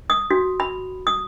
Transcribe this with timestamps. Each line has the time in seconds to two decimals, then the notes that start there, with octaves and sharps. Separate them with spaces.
0.10 D#6
0.31 F#4
0.60 B5
1.07 D#6